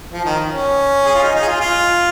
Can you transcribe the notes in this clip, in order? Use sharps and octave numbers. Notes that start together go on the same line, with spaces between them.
F3
D#3
C#4
G#4
F4
D#4
D#4
G#4
F4
F4